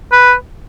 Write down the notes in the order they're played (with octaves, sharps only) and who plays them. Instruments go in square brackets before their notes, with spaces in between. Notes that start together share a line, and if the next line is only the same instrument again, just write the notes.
[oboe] B4